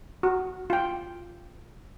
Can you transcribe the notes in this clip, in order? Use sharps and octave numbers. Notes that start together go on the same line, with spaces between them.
F#4
F4 G5